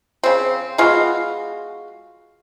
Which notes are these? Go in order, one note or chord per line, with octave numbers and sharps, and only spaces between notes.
C#3 C4
G#3 B3 F4 F#4